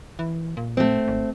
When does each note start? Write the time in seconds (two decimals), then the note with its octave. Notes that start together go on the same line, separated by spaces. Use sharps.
0.19 E3
0.57 A#2
0.77 A3 C4
1.08 G#1